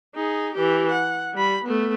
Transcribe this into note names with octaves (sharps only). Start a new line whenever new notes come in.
D#4 G#4
E3 G4
F#5
G3 B5
A3 B3